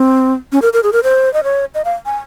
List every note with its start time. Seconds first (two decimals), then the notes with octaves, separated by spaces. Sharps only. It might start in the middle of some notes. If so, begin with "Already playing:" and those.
Already playing: C4
0.52 C#4
0.62 A#4
0.73 A#4
0.83 G#4
0.93 A#4
1.04 C5
1.34 D#5
1.44 C#5
1.75 D#5
1.85 F5
2.06 G#5